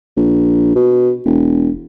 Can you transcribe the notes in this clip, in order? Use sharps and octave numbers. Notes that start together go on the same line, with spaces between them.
A#1
B2
E1